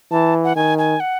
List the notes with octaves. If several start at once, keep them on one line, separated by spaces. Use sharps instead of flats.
E3 A5
F#5
D#3 G#5
G#5
F#5